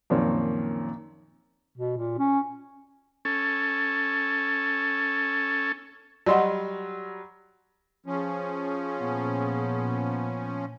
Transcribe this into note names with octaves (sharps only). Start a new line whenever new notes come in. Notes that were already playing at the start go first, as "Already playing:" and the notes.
F#2 A#2 D#3 F3 C4 C#4
B2
A#2
C#4
C#4 A4
F#3 G3 D5 D#5 F#5 C6
F3 C#4 G#4
A#2 B3